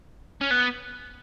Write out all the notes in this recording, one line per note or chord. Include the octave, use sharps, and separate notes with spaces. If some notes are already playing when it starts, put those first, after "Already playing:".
C#4
B3